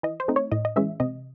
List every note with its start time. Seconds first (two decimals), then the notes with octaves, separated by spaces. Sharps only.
0.03 E3 D#5
0.20 C5
0.28 A3 C4 D#4
0.36 C#5
0.52 A2 D#5
0.65 D#5
0.76 E3 G#3 C#4 E5
1.00 C3 D#5